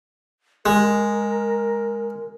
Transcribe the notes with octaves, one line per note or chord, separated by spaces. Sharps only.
G#3 A#4